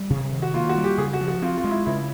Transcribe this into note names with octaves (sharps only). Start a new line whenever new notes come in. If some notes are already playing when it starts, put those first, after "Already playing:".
Already playing: G3
C3
D#3
F#4
A#3 F4
F#4
G3
G4
C#3 G#4
F#4
F3
F#4
C4 F4
F4
G#3
E4
C#3 E4